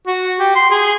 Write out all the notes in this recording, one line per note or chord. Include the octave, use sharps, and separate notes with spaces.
F#4
G4
C6
G#4